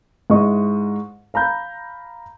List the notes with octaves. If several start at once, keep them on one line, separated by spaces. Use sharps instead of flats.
G#2 G#3 E4 D#5 C#6
F5 A#5 B5 G6